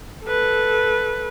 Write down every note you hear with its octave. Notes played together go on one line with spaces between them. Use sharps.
A4 B4